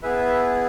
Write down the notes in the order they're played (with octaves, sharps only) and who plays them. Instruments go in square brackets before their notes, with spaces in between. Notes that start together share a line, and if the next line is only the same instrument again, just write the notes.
[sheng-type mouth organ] B3 E4 G#4 B4 E5